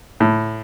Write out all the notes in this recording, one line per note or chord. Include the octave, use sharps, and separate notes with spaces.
A2